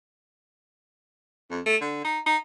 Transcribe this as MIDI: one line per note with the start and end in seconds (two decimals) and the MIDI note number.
1.50 1.60 41
1.66 1.76 57
1.81 2.01 50
2.04 2.19 63
2.26 2.37 63